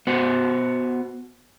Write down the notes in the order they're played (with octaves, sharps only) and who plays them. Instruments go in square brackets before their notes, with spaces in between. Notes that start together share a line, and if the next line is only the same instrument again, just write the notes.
[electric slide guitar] B3 F#4 C5